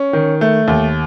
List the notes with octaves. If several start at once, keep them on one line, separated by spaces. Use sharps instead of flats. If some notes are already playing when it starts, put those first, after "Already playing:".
Already playing: C#4
D#3
A3
D#2